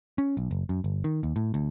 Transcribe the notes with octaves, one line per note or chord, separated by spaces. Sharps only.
C#4
B1
F#1
F#2
G1
D#3
D#2
A2
D2